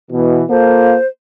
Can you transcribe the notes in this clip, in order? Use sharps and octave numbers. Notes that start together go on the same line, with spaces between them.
B2 E3
A#3 F4 A4 C5